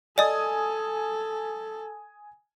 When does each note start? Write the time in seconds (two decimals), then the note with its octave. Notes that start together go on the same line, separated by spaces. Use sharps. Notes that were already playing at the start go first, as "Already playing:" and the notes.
0.18 A4 D5 D#5 G#5 D#6